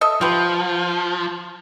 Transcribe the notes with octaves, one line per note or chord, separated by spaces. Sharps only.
A4 D#5 E5
F3 F4 G4 B4